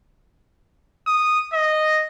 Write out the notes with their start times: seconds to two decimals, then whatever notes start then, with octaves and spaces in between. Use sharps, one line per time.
1.07 D#6
1.54 D#5